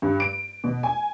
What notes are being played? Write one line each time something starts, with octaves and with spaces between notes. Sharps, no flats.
G2
D7
B2
G#5